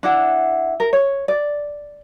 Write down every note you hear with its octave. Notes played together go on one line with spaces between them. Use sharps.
D4 E4 F#5
A#4
C#5
D5